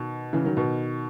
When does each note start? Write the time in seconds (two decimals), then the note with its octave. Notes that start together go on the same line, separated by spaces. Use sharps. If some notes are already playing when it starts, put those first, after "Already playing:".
Already playing: B2 D#3
0.33 C#3 E3
0.44 D#3 F#3
0.56 B2 D#3